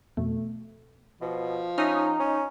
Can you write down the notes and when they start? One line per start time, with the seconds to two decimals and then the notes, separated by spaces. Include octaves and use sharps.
0.17 F2 B2 A3
1.21 B2 F3
1.78 C#4 D#4 E5 D#6 F6
2.20 C#4